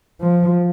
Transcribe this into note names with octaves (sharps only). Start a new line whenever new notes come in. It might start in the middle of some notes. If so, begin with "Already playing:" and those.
F3